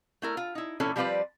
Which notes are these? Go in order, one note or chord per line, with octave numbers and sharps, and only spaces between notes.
A3 E4 A#4
F4
D#4 E4
A#2 E3 C#4 E4 A4
F3 G3 C4 F4 B4 D5